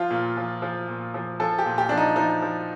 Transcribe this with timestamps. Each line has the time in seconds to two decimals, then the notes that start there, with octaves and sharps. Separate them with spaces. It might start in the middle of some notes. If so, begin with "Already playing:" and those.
Already playing: F3 F4
0.11 A#2
0.37 F3
0.62 F3
0.88 A#2
1.14 F3
1.40 F3 A4
1.58 G4
1.66 A#2
1.78 G4
1.89 F3 D4
1.98 D#4
2.16 F3 D#4
2.42 F3